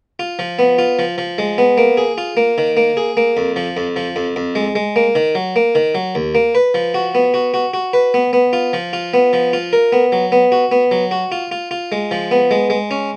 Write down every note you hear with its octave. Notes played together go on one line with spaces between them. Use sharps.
F4
F3
B3
F4
F3
F3
G#3
B3
A#3
G#4
F4
A#3
D#3
A#3
G#4
A#3
F2
F3
F2
F3
F2
F2
G#3
G#3
A#3
D#3
F#3
A#3
D#3
F#3
D#2
A#3
B4
F3
F#4
B3
F#4
F#4
F#4
B4
B3
B3
F4
F3
F4
B3
F3
F4
A#4
B3
F#3
B3
F#4
B3
F#3
F#4
F4
F4
F4
G#3
F3
B3
G#3
G#3
C#4